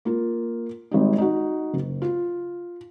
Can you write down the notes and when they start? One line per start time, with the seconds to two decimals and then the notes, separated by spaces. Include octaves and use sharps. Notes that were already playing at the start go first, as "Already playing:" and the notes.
0.05 A#3 F4
0.91 G#1 G3 D#4
1.18 D#4 F#4
1.74 F#1
2.02 F4